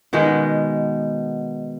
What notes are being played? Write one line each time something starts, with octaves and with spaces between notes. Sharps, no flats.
B2 D#3 G#3 B3